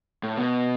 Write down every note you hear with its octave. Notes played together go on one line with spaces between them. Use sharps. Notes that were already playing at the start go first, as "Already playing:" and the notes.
A2
B2